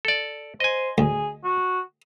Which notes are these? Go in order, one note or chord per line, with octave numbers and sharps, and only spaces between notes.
A4 D5
C5 D#5 G#5
D2 G#4
F#4